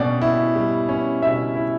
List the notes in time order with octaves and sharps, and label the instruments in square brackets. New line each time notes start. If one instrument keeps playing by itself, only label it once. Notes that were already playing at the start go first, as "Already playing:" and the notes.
Already playing: [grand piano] B2 G3 C#4 [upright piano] F#4 G4 D5 F#5
[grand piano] E4
G3
C#4
[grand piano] B2 [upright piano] E5
[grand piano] E4